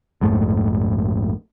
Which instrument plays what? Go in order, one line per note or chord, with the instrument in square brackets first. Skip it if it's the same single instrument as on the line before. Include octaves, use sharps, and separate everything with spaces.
[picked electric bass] A#1 F2 G#2 A3